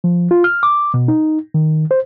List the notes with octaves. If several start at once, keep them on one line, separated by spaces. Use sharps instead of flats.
F3
F4
F6
D6
B2
D#4
D#3
C5